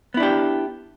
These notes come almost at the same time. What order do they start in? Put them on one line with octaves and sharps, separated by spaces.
B3 E4 D4 G4